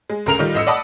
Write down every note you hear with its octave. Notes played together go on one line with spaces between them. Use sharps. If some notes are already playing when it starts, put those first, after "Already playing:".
G#3
D2 C#3 A#4 A#5 F7
D#3 G3 D#4 F4
A1 D#5 E6 C#7
D5 D#5 F#5 A5 B5 D#6